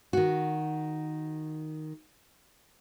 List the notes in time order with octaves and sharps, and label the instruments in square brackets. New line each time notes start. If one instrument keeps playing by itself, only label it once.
[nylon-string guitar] D#3 F#4